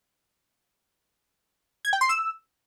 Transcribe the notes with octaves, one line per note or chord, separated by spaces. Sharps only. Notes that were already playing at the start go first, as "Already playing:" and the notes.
G#6
G5
C6
E6